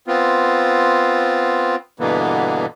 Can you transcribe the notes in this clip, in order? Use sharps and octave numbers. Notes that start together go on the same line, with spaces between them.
B3 C4 F4
G2 B2 D3 E3 A#3 B3